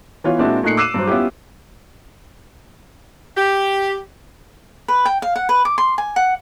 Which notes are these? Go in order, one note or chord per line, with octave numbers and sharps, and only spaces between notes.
E3 B3 F4 C#5
A#2 G#3 C4 D4 E4 F#4
A#2 A3 D#4 F#6 C7 C#7
D6 E6 F#6 C7 D#7 E7
G2 F#3 C5
B3 C#4 E4 F4 G4
G4
B4
G5
F5
F#5
B4
D6
C6
G#5
F#5